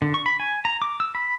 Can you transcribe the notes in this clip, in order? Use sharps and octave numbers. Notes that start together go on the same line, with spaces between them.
D3
C#6
B5
G#5
A#5
D6
E6
B5